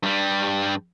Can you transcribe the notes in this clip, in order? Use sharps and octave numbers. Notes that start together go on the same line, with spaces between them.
G2 G3